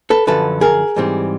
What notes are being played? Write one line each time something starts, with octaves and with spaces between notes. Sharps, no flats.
A4 B4
F#2 D3 F3 A4 B4
G#4 A#4
G#2 E3 G3 C4